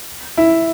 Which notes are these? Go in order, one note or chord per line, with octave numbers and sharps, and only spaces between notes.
E4